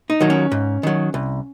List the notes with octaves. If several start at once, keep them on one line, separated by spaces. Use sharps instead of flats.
D#4
D#3 F#3
C#4
G#2
D#3 F#3
C2